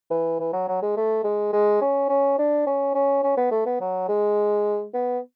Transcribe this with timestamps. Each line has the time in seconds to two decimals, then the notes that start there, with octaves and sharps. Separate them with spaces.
0.10 E3
0.40 E3
0.53 F#3
0.68 F#3
0.83 G#3
0.97 A3
1.24 G#3
1.53 G#3
1.81 C#4
2.09 C#4
2.38 D4
2.67 C#4
2.95 C#4
3.24 C#4
3.37 B3
3.51 A3
3.66 B3
3.81 F#3
4.08 G#3
4.94 B3